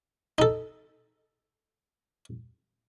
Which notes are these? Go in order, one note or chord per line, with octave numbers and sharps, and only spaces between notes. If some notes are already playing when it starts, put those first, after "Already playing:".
D#4 A4